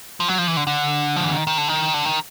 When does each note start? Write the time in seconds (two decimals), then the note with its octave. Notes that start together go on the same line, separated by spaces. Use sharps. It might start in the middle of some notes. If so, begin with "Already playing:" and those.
0.20 F3
0.28 F#3
0.38 F3
0.48 E3
0.57 D3
0.67 D3
1.16 F3
1.24 E3
1.32 D#3
1.47 D#3
1.58 D3
1.68 D#3
1.94 D3
2.05 D#3